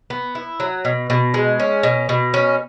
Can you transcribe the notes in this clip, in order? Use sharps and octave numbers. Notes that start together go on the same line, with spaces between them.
B3
E4
F#3
B2
B2
G#3
C#4
B2
B2
C#4